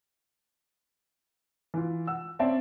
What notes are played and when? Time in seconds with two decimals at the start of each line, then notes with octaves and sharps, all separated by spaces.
1.74 E3 F4
2.07 F#5 E6
2.39 C4 C#4 D5 E5 A5